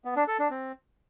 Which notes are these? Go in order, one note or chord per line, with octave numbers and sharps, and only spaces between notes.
B3
D4
A4
D4
C4